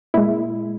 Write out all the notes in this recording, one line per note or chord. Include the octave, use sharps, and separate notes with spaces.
A#2 G#3 E4